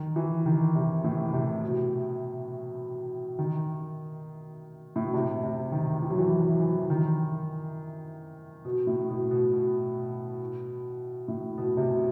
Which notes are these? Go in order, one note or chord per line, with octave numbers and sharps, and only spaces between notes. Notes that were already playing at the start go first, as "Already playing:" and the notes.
Already playing: D#3
E3
D#3
C3
A2
C3
B2
D#3
A2
B2
C3
C3
D#3
E3
F#3
E3
F#3
E3
D#3
B2
A2
B2
B2
B2
A2
B2
C3
B2